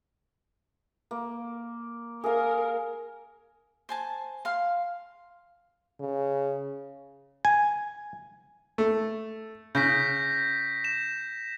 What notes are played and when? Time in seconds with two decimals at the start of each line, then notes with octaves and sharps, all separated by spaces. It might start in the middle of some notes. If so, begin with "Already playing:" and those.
1.11 A#3
2.24 G#4 A#4 F5
3.89 C5 G#5 A5
4.45 F5 C6
6.00 C#3
7.45 G#5
8.78 A3
9.75 C#3 G6 A#6 B6
10.84 E7